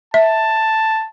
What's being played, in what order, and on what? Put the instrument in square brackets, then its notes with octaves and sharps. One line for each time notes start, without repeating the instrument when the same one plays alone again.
[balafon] E5 [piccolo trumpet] A5